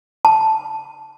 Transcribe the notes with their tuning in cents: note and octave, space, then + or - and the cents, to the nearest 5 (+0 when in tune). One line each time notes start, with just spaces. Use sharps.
A5 -5